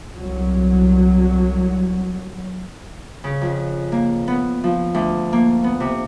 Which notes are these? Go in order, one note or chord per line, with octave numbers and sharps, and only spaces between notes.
C2 F#3
C#3
F2
A#3
B3
F3
D2
A#3
B3
C3